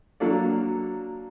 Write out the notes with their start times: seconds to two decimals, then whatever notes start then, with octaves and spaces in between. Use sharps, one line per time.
0.20 F#3 A#3 D4 A4 D5